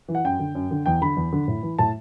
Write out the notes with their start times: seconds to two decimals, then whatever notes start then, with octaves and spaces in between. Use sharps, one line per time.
0.08 E3
0.15 F#5
0.24 F#2 G5
0.39 D3
0.55 F#2
0.71 D3
0.86 E2 G5
1.02 D3 B5
1.16 E2
1.33 D3
1.48 A2
1.63 E3
1.78 A2 A5